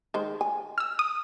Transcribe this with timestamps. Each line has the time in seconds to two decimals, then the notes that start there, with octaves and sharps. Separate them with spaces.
0.14 D#3 G#3 C5
0.41 G#5
0.78 E6 F6
0.99 D#6